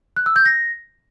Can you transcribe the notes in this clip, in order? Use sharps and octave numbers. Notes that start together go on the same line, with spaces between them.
F#6
E6
G6
A#6